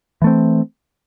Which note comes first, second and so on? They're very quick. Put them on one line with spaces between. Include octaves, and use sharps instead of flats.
E3 A3 C4